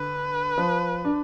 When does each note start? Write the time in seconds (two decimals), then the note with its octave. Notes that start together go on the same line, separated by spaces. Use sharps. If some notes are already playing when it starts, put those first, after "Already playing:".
Already playing: D3 B4
0.58 F3
1.05 D4